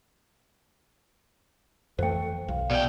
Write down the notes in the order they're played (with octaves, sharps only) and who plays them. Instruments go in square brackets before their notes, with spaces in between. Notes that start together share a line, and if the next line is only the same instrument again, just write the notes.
[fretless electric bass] F2 E3 A3 [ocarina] A4 [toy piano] C5 G5
[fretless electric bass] B1 [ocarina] F5
[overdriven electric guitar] B2 G5 [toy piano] D5